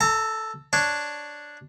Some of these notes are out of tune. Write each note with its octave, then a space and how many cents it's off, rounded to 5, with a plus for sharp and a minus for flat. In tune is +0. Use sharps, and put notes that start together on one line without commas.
A4 +0 A#5 -40
D4 +0 C#5 +0